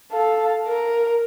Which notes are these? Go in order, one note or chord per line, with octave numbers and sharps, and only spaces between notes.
A4 F5
A#4